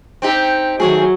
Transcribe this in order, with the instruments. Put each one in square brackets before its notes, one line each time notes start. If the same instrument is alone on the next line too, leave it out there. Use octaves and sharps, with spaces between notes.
[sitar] C4 D#4 G4
[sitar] D#3 A3 G#4 [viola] F#3